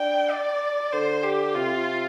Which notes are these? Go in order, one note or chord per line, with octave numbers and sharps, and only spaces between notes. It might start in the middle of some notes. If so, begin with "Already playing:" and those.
Already playing: D4 G5
D5
D3 C5
G4
C3 F4